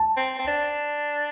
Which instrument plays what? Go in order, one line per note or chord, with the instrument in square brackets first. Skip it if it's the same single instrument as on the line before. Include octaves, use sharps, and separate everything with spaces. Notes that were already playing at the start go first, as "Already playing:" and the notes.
Already playing: [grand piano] A5
[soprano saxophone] C4
C4
D4